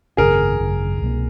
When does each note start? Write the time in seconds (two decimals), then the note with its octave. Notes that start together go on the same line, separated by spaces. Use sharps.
0.17 G#1 F#2 C#3 G#4 A#4
0.60 G#1 F#2 C#3
1.01 C2 B2 F#3 A#3